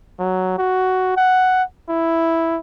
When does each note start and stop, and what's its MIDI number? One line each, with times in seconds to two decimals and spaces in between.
0.19 0.58 54
0.58 1.12 66
1.17 1.63 78
1.89 2.59 64